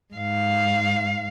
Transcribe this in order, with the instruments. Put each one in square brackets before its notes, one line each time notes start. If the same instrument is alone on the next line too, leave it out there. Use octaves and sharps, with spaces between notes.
[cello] G#2 F5